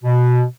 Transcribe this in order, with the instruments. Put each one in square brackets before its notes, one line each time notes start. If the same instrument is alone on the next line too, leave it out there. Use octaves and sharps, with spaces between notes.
[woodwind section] B2